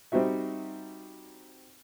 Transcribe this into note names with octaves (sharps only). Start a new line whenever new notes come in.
G3 C4 D#4 F#4 E5